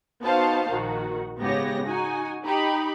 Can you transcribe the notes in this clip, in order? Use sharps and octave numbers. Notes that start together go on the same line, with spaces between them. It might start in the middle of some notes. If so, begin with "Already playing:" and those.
B3 D#4 F#4 C5 F5 A5
A#1 D#3 F#4
G#2 C#3 B3 G4 C#5 A#6
D#4 F#4 G#5
D#4 G4 B5